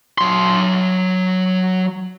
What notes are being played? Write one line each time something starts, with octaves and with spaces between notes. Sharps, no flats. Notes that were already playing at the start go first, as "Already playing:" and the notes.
F#3 C6